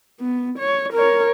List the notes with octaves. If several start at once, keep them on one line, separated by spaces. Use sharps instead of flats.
B3
C#5
A#4 C#5